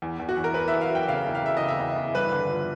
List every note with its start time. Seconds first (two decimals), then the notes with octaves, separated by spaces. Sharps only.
0.02 E2
0.20 E2
0.29 F#4
0.37 E2
0.44 A#4
0.54 E2 B4
0.68 E5
0.73 E2
0.81 F5
0.90 F#3
0.95 G5
1.08 C#3 F5
1.26 E2
1.35 F5
1.44 C#3 E5
1.57 C#3 D#5
1.69 E5
1.78 E2
1.96 E2
2.14 G2 B4
2.32 D3
2.49 F3